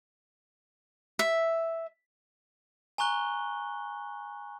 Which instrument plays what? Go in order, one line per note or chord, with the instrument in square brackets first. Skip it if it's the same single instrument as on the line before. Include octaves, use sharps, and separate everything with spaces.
[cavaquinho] E5
[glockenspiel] G#5 A#5 C#6 F#6 G7